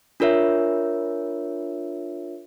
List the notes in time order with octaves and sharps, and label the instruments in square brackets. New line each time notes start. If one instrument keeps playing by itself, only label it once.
[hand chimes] D4 F4 A#4 C#5 E5